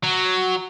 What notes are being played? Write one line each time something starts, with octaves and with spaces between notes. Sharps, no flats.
F#3